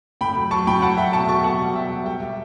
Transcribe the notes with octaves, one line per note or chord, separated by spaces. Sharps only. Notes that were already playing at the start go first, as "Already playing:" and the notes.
A2 G5 B5
F#3
F#3 A5 C#6
A2 G5 B5
F#3 F#5 A5
F#3 E5 G5
B2 A5 C#6
F#3 A5 C#6
B2 F#5 A5
G3
B2 E5 G5
G3
G3 E5 G5
G3